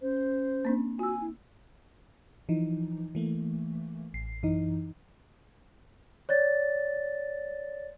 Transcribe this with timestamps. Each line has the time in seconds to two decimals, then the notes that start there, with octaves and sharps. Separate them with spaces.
0.01 C#4 C5
0.65 A#3 C4 D4
0.99 F4 F#4 G#5 E6
1.21 E4
2.49 E3 F3 D#4
3.15 E3 A3 A#3
4.14 A1 C7
4.43 F#2 E3 D#4
6.29 C#5 D5 A6